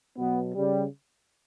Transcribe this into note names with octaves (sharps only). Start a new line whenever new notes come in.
B2 F#3 B3
C#3 G3